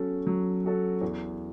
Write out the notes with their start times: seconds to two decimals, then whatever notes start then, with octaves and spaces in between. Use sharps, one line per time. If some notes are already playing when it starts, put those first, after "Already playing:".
Already playing: F#3 C#4 F#4 A4
0.26 F#3
0.64 C#4 F#4 A4
1.01 E2